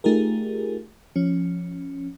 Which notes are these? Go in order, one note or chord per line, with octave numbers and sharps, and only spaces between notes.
A3 D#4 F4 G4 G#4 A#4
F3 C#4